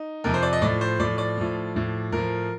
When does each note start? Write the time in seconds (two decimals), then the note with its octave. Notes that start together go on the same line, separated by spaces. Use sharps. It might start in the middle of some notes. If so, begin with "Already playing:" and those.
Already playing: D#4
0.24 F2 C3 F3 A#4
0.34 C5
0.43 D5
0.53 D#5
0.62 A2 F3 D5
0.81 C5
1.00 A2 F3 D5
1.18 D5
1.37 A2 F3
1.75 A2 F3
2.12 A2 F3 A#4